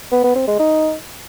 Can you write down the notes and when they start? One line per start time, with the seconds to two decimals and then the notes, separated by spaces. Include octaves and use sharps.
0.12 B3
0.24 B3
0.36 C4
0.47 G#3
0.59 D#4